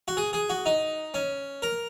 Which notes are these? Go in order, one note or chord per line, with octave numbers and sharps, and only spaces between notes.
F#4
G#4
G#4
F#4
D#4
C#4
A#4